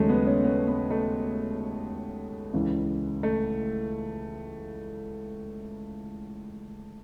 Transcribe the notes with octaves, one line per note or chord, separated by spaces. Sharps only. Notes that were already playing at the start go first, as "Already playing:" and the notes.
Already playing: D#2 C#3 F#3 G#3 A3
B3
C#4
B3
B3
A3
C#2 C#3 E3
A3